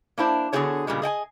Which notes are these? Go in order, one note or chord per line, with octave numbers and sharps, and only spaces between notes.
A#3 D4 E4 C5
D3 B3 F#4 G#4 C5 C#5
G2 A#2 C#3 G3 G#3
G#4 D#5 G5 G#5